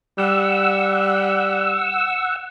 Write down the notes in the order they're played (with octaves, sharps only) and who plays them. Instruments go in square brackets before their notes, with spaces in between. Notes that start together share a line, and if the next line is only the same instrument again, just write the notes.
[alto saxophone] G3 [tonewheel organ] F#5 E6